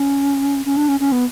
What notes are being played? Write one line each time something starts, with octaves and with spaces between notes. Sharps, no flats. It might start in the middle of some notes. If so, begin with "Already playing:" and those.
Already playing: C#4
C#4
D4
C#4
C#4
B3